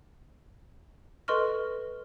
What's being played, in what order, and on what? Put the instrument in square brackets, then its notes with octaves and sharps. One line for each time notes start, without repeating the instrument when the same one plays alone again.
[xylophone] A4 B4 D#5 C6 C#6 F6